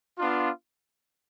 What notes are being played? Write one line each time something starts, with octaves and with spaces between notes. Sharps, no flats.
B3 D4 F4